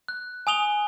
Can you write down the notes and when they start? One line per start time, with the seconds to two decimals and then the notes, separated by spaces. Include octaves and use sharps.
0.08 F#6
0.47 G#5 D#6 F7 G7